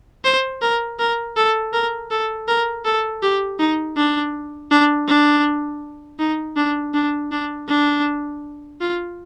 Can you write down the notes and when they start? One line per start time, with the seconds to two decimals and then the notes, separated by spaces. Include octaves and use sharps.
0.24 C5
0.62 A#4
0.99 A#4
1.36 A4
1.73 A#4
2.11 A4
2.48 A#4
2.85 A4
3.22 G4
3.59 D#4
3.97 D4
4.71 D4
5.08 D4
6.19 D#4
6.57 D4
6.94 D4
7.31 D4
7.68 D4
8.81 F4